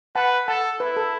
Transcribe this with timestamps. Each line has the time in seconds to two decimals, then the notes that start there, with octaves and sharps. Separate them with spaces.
0.15 B4 F#5 A5
0.48 A4 F#5 A5
0.80 E4 B4
0.97 A4